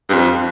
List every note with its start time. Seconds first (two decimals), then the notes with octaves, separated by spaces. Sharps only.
0.09 G2
0.13 F2